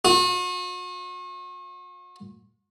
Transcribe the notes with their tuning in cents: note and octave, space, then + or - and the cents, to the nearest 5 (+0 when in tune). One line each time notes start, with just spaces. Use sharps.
F#4 -45